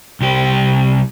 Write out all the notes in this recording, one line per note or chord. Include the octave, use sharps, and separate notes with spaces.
C2 G4